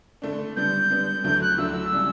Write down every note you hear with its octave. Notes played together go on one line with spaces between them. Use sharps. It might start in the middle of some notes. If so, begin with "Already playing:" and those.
D3 A3 D4
D3 G3 B3 G6
D3 G3 B3
D2 D3 F#3 A3 E4 G6
F#6
D2 D3 F#3 A3 E4 E6
C#3 G3 C#4